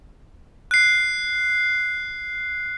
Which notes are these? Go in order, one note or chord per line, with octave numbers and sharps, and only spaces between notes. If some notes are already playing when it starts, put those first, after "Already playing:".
F#6 C7